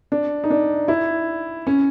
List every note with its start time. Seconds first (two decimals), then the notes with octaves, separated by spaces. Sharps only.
0.12 D4
0.44 D#4
0.50 D4
0.88 E4
1.67 C#4